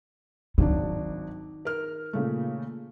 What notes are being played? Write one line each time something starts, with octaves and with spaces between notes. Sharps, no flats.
G#1 D#3 F#3 D4
A#4 F6
A#2 C#3 A3